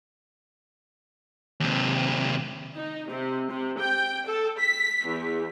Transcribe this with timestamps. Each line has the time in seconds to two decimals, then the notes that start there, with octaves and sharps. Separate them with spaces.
1.60 D#2 C3
2.75 D#4
3.08 C3
3.50 C3
3.80 G5
4.26 A4
4.58 B6
5.06 E2